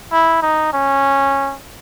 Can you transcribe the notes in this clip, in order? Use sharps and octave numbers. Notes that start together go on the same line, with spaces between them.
E4
D#4
C#4